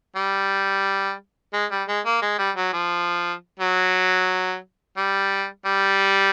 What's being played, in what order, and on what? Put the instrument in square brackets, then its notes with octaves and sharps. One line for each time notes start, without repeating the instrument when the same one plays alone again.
[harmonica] G3
G#3
G3
G#3
A#3
G#3
G3
F#3
F3
F#3
G3
G3